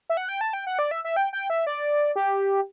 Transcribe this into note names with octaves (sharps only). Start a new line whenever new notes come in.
E5
F#5
G5
A5
G5
F#5
D5
E5
E5
G5
G5
E5
D5
G4